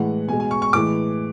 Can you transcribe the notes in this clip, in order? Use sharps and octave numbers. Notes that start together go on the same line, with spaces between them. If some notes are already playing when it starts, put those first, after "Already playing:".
Already playing: A2 E3 G#3 F#5
B2 G#3 G#5
G#5
C#6
C#6
A2 E3 G#3 D6